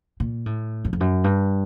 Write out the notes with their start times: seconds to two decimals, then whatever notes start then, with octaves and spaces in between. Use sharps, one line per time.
0.20 A#2
0.46 A2
0.85 F#2
0.93 F2
1.00 F#2
1.24 G2